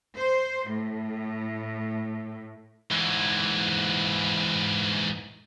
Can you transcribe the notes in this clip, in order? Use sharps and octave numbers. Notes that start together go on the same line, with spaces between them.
C5
A2
G#2 E3